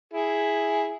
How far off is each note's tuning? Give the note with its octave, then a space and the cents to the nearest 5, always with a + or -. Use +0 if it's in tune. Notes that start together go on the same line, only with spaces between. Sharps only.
E4 +0 G#4 +0